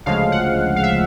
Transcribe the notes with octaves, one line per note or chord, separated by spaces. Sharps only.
D2 C#3 F3 G#3 F5
F#5
F5
E5